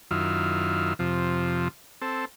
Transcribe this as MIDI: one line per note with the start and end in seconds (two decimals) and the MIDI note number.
0.11 0.94 42
0.11 0.94 51
0.11 0.94 64
0.11 0.94 65
0.99 1.68 41
0.99 1.68 48
0.99 1.68 53
2.01 2.25 60
2.01 2.25 69